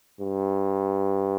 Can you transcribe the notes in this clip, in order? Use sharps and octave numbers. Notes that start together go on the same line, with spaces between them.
G2